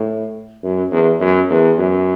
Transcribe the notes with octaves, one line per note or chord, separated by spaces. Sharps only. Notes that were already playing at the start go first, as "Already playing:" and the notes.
Already playing: A2
F#2
E2
F#2
E2
F#2